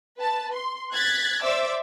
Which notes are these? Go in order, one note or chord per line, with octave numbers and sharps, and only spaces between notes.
B4 A5
C6
F#6 G#6 A6 B6
C5 D5 E5 D6 E6